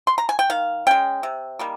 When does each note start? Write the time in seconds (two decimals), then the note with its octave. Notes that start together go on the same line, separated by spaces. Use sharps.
0.07 C6
0.18 A#5
0.29 G#5
0.39 G5
0.50 D#3 F5
0.87 G#3 C#4 G5
1.23 C3
1.59 D#3 G3 A#3